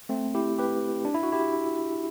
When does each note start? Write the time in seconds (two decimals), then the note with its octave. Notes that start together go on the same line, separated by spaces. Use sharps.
0.09 A3 C4
0.35 E4 G4
0.58 G4 B4
1.05 D4
1.14 E4
1.23 F#4
1.32 E4 G4